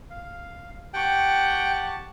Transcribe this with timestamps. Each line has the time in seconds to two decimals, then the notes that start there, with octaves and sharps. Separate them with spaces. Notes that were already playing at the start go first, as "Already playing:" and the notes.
0.10 F5
0.94 G4 F#5 G5 A5 C#6